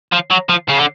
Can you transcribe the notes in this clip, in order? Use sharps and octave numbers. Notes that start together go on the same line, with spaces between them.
F3
F#3
F3
C#3
D3